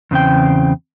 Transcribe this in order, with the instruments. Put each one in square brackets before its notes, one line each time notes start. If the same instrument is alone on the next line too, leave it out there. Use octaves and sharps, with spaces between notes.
[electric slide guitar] E2 C#3 C4 G5